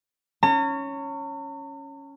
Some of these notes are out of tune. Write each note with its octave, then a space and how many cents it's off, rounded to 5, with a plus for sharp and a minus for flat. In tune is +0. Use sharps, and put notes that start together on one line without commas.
C#4 +0 A#5 -45